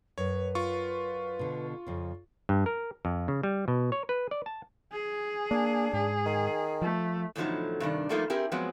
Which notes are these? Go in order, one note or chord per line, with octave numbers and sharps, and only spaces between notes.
F#2 B4 C#5
F4 C#6
B2 D3
F2 C#3
G2
A#4
F2
C#3
G3
B2
C#5
B4
D5
A5
G#4
A#3 D4
G#2 G#4
D#3
F3 A3
E2 A2 D3 F3 F#3 D#4
G2 C3 D#3 D4
F3 G3 A3 A#3 D#4 F4
C4 E4 G4 G#4 A#4
F3 F#3 G#3 B3 C4